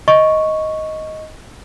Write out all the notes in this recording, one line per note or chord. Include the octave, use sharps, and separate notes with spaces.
D#5 C#6